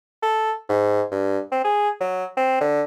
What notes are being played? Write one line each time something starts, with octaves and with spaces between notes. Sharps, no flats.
A4
G#2
G2
C4
G#4
F#3
C4
D3